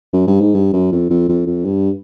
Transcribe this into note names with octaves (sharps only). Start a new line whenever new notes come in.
F#2
G2
G#2
G2
F#2
F2
F2
F2
F2
G2